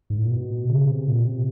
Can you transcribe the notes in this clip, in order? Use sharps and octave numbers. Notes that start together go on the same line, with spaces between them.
G#2
A2
A#2
B2
C#3
C3
A#2
C3